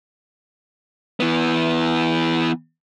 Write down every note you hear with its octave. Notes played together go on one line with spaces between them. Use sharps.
E3 B3